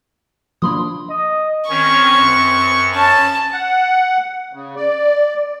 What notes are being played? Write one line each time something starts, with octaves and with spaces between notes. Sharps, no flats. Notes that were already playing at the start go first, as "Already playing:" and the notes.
F3 A#3 D4 B5 C6 D#6
D#5
D#3 C4 C#4 C#5 C#6
F#2
C#4 A5
F#5
C#3
D5